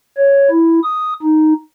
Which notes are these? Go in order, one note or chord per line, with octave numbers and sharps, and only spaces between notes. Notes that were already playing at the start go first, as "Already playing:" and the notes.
C#5
E4
D#6
D#4